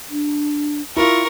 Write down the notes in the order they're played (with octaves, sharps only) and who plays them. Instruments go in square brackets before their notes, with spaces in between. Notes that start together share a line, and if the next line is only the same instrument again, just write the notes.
[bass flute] D4
[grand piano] E4 F4 [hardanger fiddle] A#4 C#6